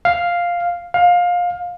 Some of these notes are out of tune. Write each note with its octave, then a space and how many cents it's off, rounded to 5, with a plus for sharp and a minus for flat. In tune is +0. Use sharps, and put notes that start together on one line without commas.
F5 +0
F5 +20